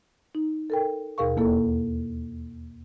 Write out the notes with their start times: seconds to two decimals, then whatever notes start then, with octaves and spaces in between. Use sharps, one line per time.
0.35 D#4
0.70 A4 A#4 G5
1.18 D#2 B2 G#4 A#4 F5 C#6
1.37 E2 A#3 E4 A4